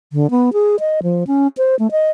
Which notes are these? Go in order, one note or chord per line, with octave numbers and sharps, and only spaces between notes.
D3
B3
G#4
D#5
F3
C#4
C5
A3
D#5